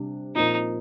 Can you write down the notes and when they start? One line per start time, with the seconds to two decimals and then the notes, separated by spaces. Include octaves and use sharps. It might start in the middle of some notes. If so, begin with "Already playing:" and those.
Already playing: C3 G3 D4
0.35 A#2 F3 C4 D#4 F4 A#4